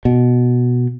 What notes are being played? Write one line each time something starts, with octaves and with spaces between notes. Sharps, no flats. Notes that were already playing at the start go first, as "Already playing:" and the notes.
B2